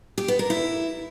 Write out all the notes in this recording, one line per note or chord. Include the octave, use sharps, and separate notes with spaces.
G4
B3
A#4
E4